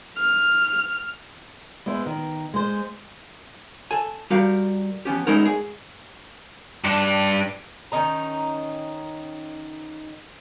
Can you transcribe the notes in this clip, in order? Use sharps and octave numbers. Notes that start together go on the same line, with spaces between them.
F6
G#3 B3 E4 C5
D#3
G#3 C5
A4 G#5
G3 F#4 G4 A#4 F5
F3 B3 C#4 G4
G#3 B3 C#4 D#4 E4 A#4
G#4
G2 D4
D#3 C#4 D#4 A#5